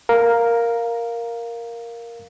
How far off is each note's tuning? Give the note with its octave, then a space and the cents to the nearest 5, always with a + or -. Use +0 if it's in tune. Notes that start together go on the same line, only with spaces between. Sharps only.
A#4 +0 F5 +0